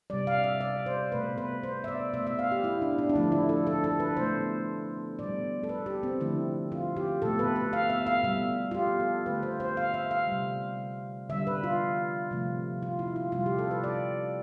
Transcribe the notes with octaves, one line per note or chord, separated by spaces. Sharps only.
C3 G3 D5
F5
E5
D5
C5
B2 A3 B4
B4
C5
E5
D5
B2 A3 E5
E5
F5
G4
E4
D4
D4
D4
D3 F3 A3 E4
E4
A4
A4
A4
B4
B2 A3 C5
B2 G3 D5
A4
B4
G4
C4
D3 F3 A3 E4
F4
G4
B2 A3 A4
B4
B4
F5
E5
F5
B2 G3 E5
F4
G4
A4
D3 A3 B4
C5
C5
F5
E5
F5
C3 G3
D3 G3 E5
B4
F4
C3 F3 A3
F4
E4
F4
C3 G3 F4
G4
A4
B4
D5